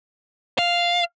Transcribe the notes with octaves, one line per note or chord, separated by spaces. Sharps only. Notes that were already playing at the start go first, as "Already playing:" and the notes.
F5